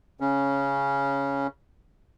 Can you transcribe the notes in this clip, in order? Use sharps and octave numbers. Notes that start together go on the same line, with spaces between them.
C#3 C#4